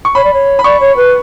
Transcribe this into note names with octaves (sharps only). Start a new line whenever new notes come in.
C#6
C#5 B5
D5
C#5
B5
D5 C#6
C#5
B4